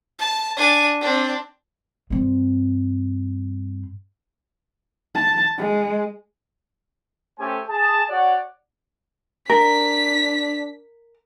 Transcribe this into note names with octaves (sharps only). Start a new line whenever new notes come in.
A5
D4 G#5
C4 D4
G2 C4
A5
G#3
A3 C#4 G4 A4 C5 G#5
G#4 A5
F#4 C#5 D5 F#5
D4 A#4 B6